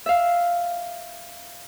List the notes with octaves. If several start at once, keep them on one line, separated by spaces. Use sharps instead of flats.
E5 F5